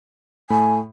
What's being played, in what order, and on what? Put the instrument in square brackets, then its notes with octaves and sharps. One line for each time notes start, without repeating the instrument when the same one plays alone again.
[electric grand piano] A2 A3 B5 [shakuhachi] G#5